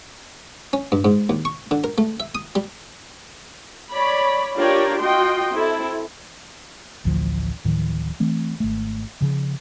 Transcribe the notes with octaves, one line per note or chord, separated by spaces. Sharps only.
C#4
G2
G#2
D#2
C#6
D3
A#4
A3
E5
D#6
G3
C#5 D5 B5
D4 F4 G4 A#4 C#5 D5
F4 F#4 D#5 G5 C6
C4 E4 A4
A1 D2 D3 F3
D1 A2 D#3 F3
E3 A3 C4
G#1 A3
C#3 F3